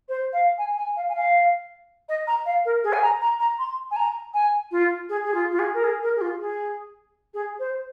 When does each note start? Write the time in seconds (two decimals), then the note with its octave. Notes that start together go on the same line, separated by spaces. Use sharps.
0.08 C5
0.33 F5
0.58 G#5
0.77 G#5
0.96 F5
1.09 G#5
1.15 F5
2.08 D#5
2.27 A#5
2.45 F5
2.65 A#4
2.83 G#4
2.92 G#5
3.02 A#5
3.21 A#5
3.39 A#5
3.58 C6
3.91 G#5
3.96 A#5
4.33 G#5
4.71 F4
5.09 G#4
5.24 G#4
5.34 F4
5.51 F4
5.59 G#4
5.74 A#4
5.83 G#4
6.02 A#4
6.16 G#4
6.21 F4
6.40 G#4
7.34 G#4
7.59 C5